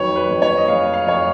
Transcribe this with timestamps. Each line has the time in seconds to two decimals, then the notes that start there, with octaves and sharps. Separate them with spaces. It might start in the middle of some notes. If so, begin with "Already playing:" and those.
Already playing: F2 D#3 F#3 B4 C#5
0.16 B4
0.29 F2
0.42 C#5
0.57 D#5
0.68 F2 F5
0.93 F5
1.06 F2 C#5